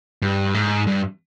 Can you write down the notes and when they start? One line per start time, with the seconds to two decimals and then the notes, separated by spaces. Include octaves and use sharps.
0.22 G2
0.54 G#2
0.87 G2